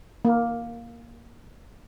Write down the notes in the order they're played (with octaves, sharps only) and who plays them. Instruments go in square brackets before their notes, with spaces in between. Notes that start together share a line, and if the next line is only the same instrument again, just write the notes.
[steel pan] A#3